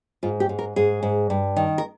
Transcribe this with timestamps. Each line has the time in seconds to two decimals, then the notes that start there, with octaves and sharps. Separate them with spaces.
0.23 G#2 F4
0.40 G4
0.49 G#2
0.59 A#4
0.76 G#2 G#4
1.03 G#2
1.30 G2
1.56 D#3
1.78 A#4